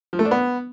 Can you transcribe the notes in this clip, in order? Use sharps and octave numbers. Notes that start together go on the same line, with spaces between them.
F3
A3
D4
B3